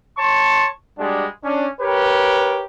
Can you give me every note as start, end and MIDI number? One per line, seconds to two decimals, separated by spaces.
0.18 0.67 73
0.18 0.67 81
0.18 0.67 84
0.18 0.67 85
0.98 1.26 55
0.98 1.26 56
0.98 1.26 62
0.98 1.26 66
1.44 1.67 61
1.44 1.67 62
1.81 2.65 67
1.81 2.65 70
1.81 2.65 71
1.81 2.65 73